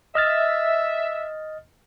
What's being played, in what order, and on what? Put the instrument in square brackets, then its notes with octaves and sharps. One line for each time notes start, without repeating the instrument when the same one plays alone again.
[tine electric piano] D#5 F6 A6 [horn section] E5